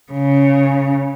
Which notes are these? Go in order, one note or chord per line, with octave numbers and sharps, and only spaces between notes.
C#3